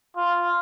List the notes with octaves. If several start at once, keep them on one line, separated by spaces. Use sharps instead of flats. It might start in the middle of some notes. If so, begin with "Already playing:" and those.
F4